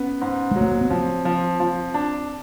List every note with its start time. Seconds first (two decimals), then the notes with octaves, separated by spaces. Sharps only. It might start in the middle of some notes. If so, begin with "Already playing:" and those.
Already playing: B3 C#4
0.21 G#2
0.51 F#3 G#3
0.61 A3
0.72 A#3
0.81 B3
0.90 F3 C4
1.25 F3
1.60 F3
1.94 D4